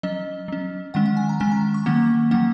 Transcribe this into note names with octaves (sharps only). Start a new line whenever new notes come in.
F#3 C#4 D#5
F#3 C#4
D#3 G#3 C#4 F#5
F#5
G#5
A#5
D#3 G#3 C#4 G#5
A#5
C#6
D#3 F#3 A#3 C#4 F#5
D#3 F#3 A#3 C#4 F#5